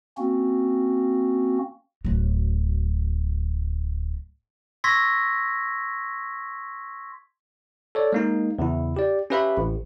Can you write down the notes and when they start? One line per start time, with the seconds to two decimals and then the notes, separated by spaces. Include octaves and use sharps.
0.18 A#3 C4 C#4 F#4
2.05 D1 F#3
4.84 C6 C#6 E6 G#6 A#6 B6
7.95 A4 C#5 D5
8.13 G#3 A#3 D#4
8.59 E2 C#3 E4
8.97 G4 D5
9.30 C#4 G4 B4 E5 F5 B5
9.57 A1